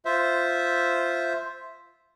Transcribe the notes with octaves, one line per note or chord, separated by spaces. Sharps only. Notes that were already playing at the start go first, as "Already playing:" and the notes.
F4 C5 E5